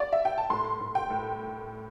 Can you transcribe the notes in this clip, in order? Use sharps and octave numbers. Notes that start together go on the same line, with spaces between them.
D5
E5
G5
A5
A2 C6
A2
G5
A2